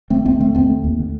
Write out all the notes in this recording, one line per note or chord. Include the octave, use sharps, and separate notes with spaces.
D3 A3 C4
D#2 A3 C4
D3 A3 C4
D#2 A3 C4
D3
D#2
D3